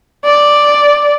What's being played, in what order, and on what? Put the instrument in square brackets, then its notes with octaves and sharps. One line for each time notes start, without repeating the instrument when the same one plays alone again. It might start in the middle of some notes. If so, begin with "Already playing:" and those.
[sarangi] D5